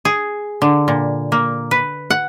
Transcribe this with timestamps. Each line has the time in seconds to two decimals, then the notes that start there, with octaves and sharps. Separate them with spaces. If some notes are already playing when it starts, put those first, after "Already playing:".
0.05 G#4
0.62 D3
0.88 A#2
1.32 A#3
1.71 B4
2.10 F#5